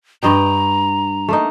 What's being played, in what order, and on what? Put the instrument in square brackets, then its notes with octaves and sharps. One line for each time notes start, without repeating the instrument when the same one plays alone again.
[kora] G2 D#5 G5 [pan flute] A#5
[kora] A3 A#3 D#4